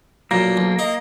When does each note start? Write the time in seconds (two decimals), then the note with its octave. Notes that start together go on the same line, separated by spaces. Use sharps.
0.31 B1 A#2 A#3
0.57 B1
0.79 D#4